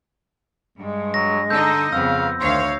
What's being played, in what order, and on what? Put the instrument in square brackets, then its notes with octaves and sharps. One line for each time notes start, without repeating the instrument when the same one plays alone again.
[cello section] G2 [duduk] G#3
[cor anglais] F#3 [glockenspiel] A#6
[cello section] D3 D#4 D#5 [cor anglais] A4 [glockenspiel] G6
[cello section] F2 B3 [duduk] C#3 [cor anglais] F5 [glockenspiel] E6
[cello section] D2 C#5 F5 [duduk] D#3 [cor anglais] C5